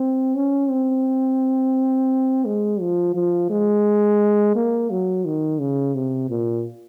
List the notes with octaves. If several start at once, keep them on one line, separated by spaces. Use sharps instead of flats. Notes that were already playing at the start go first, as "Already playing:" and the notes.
Already playing: C4
C#4
C4
G#3
F3
F3
G#3
A#3
F#3
D#3
C#3
C3
A#2